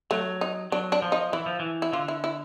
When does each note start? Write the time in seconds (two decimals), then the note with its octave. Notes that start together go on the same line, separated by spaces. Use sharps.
0.11 F#3 A3
0.41 D#4
0.72 F#3 D4
0.92 D4
1.02 F3
1.12 D#4
1.33 E3 E4
1.46 F3
1.60 E3
1.82 E4
1.93 D3 F4
2.08 E4
2.24 E4